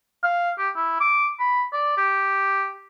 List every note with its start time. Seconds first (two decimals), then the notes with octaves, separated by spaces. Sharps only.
0.24 F5
0.59 G4
0.76 E4
1.01 D6
1.40 B5
1.73 D5
1.98 G4